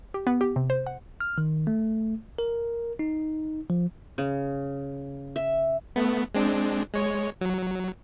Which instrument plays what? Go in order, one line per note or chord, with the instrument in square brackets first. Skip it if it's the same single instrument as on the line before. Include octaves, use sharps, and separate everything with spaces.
[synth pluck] G4
B3
G4
C3
C5
F#5
[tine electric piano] F6
D#3
A3
A#4
D#4
F3
[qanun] C#3
E5
[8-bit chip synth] A3 B3
G#3 C4 D4
G#3 C#5
F#3